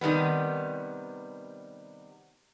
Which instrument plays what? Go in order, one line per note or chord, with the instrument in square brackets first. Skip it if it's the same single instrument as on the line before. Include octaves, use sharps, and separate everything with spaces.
[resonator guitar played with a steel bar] C3 D#3 G3 B3